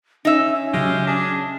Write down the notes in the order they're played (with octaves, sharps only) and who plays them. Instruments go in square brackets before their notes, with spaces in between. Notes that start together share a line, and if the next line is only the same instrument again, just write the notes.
[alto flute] C#4 [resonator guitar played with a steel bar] D#4 E5
[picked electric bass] C#3 F#3 [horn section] G#3 G4 F5
[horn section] D4 G#4